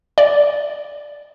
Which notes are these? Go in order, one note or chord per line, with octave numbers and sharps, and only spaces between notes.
D5